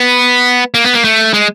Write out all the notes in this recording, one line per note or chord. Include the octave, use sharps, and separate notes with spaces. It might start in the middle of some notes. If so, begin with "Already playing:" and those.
Already playing: B3
A#3
B3
A#3
A3
G#3